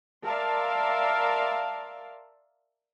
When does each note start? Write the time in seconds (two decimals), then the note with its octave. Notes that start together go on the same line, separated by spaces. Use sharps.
0.25 A#4 D5 E5 F5 A5 C6